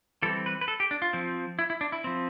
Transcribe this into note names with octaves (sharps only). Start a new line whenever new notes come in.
E3 G3 C4 A4
B4
B4
A4
G4
D4
F4
F3 C4
E4
E4
D4
E4
F3 C4